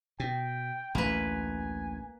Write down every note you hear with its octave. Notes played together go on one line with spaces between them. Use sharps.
B2 G5
A1 D2 A3 A#3 B4 G#5